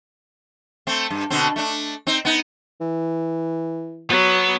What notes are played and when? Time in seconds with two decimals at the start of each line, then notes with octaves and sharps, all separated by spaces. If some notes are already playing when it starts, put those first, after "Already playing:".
0.87 A3 C4
1.10 G2
1.30 B2 D3 C4
1.56 A3 D4
2.07 C4 D#4
2.25 B3 D#4
2.81 E3
4.10 F#3 B3